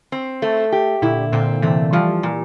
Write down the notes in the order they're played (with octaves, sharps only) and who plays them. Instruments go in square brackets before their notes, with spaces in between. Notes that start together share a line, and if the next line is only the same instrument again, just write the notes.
[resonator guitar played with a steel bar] C4
A3
G4
[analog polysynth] A#2 D3 [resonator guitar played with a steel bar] E4
[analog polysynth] A#2 D3 [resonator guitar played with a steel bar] C4
[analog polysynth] C3 E3 [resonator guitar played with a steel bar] A3
[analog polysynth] E3 G3 [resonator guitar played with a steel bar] F3
[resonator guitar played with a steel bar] A#2